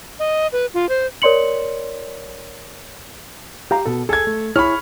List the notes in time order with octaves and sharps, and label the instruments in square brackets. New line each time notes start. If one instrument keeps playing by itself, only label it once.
[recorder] D#5
B4
F4
C5
[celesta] A#4 C#5 D5 C6 C#7 F#7
[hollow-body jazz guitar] G4 F5 A#5
B2 A4
[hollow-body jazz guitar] G#4 [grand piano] A4 G#6
[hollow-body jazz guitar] A3
[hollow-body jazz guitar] E4 G#4 C#5 [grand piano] B5 C#6 F6